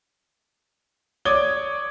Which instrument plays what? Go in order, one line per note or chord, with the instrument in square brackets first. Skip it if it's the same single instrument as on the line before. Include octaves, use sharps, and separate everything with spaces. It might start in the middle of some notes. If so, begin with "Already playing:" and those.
[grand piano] C#5 D5 D6 D#6 G#6 G7